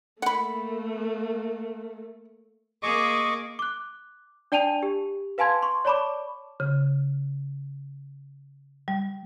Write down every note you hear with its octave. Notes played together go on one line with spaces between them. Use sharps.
A3 A#3 F#5 B5
A#3 G#4 D#5 C#6 D6
D6 F#6
D4 D5 G5 A5 D#7 F7
G4
B4 F5 G#5 A5 C6 G#6
C6 C#6
C#5 D5 A5 B5 C#6 D6
C#3
G3